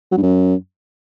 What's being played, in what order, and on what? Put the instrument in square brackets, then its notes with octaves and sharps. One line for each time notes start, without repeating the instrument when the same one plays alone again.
[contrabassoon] F#3
G2
F#2